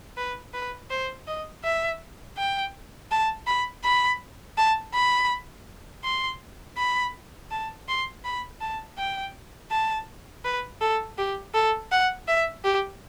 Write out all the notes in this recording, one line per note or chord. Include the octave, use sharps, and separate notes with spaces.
B4
B4
C5
D#5
E5
G5
A5
B5
B5
A5
B5
C6
B5
A5
C6
B5
A5
G5
A5
B4
A4
G4
A4
F#5
E5
G4